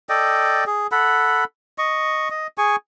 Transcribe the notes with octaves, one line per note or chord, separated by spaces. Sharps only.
A4 D5 D#5 G5
G#4
A4 F#5 B5
D#5 C#6
D#5
G#4 G#5 C#6